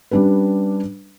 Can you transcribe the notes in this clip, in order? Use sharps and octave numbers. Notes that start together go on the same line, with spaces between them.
G3 C#4 D4 G4 B4